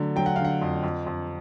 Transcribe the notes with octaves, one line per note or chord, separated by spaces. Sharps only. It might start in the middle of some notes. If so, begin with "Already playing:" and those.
Already playing: D3 F#3 A3
F#3 G5
F#5
D3 F5
F#5
F2
F2
F2